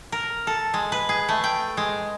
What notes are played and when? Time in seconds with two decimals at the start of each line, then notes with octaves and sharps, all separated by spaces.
0.12 A#4
0.47 A4
0.74 G#3
0.92 B4
1.09 G#4
1.29 A3
1.44 G5
1.77 G#3